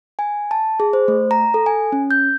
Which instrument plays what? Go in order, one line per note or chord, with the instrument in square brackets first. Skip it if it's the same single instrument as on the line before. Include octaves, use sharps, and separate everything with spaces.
[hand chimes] G#5
A5
G#4
C5
A3
A#5
A4
G#5
C#4
G6